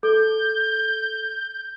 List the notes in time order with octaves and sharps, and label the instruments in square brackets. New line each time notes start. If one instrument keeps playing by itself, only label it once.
[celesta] A4 [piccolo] G6